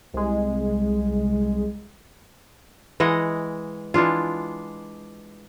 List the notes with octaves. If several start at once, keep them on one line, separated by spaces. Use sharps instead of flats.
C2 G#3
E3 G#3 D#5 F#5
E3 G#3 D4 F4